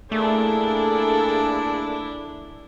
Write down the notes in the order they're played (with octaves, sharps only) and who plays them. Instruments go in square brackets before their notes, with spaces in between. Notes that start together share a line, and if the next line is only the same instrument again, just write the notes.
[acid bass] A3 [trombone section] A#3 G#4 A4 [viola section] D4 E4